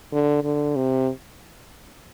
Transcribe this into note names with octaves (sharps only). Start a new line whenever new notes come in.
D3
D3
C3